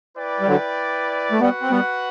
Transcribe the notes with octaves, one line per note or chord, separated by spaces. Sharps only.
E4 B4 D5 G5
G3
D3 F#3
A3
G3 B3 F#4 B4 F#5
C4
G3 B3